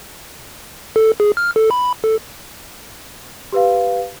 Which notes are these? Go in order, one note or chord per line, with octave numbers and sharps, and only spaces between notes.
A4
G#4
F6
A4
B5
A4
G4 B4 F5